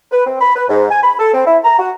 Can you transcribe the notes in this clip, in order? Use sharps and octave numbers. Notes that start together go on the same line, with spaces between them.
B4
C4
B5
B4
G#2
G#5
B5
A4
C4
E4
A#5
F#4